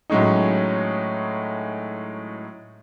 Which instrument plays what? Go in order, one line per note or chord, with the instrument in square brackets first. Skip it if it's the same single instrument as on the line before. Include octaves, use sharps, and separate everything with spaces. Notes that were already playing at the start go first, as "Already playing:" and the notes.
[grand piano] A2 F#3 G#3 C#4 D#4